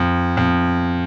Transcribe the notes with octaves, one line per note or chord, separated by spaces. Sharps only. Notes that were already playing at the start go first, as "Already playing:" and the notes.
Already playing: F2
F2